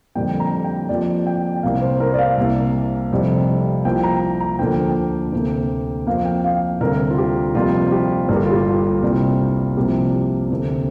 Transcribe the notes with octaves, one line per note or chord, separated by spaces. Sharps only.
F2 D3 G3 A#3 G5
A#5
G5
F2 F3 A#3 D5
G5
G5
C2 C3 G3 A#3 F5
C5
A#4
D5
F5
C2 C3 A#3
F1 F2 C3 G3
C2 C3 F3 A#3 G5
A#5
A#5
D2 D3 F3 A#3 G5
D2 C3 A#3
F2 F3 A#3 F5
G5
F5
D2 C3 G3 A#4
F4
G4
F2 C3 G3 A#3 F4
G4
G1 G2 G3 A#3 A#4
G4
F4
G4
F4
C2 C3 G3 A#3
C2 C3 F3 A#3 G4
D2 C3 A#3